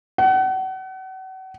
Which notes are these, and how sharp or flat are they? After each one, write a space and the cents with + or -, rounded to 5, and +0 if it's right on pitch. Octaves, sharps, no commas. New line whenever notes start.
F#5 +35